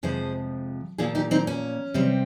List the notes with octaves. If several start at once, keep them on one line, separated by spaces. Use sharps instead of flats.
F2 C3 F3 G#3 G#4 C5
A#2 F3 A#3 F4 G#4
D#4 G4
C4 D#4
C#4
C3 G3 C4